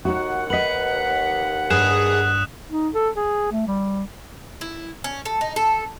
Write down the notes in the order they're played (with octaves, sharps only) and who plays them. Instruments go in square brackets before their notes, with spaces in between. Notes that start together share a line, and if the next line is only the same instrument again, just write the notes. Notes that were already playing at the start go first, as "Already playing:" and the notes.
[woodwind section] D#2 F#5 [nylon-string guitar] D#4 F#4
[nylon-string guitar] B4 D#5 [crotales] B6 F#7
[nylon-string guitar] G2 [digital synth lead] G#4 [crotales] D#6 F#6 E7
[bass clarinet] D#4
A4
G#4
A3
G3
[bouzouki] E4
C#4
A4
D#4
A4